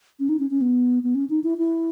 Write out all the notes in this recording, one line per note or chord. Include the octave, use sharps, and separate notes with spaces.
C#4
D#4
C#4
C#4
B3
B3
C#4
D#4
E4
E4